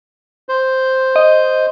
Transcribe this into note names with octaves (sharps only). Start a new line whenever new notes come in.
C5
D#5